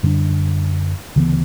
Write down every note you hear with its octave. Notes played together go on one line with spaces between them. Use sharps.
F#2 D3 G3 D4
D2 C#3 E3 B3